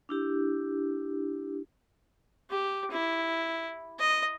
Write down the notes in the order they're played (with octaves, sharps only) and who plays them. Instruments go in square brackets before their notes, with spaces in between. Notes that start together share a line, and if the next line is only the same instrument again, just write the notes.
[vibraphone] D4 E4 G4
[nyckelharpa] G4
E4
D#5